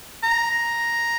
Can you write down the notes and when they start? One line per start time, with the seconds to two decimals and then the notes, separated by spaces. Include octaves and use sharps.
0.23 A#5
0.51 A#5